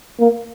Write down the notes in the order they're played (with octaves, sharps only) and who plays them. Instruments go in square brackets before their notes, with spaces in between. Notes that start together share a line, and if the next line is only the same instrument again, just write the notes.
[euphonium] A#3